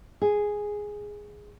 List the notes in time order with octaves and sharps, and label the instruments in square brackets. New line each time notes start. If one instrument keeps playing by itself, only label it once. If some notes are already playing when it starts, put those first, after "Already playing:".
[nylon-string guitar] G#4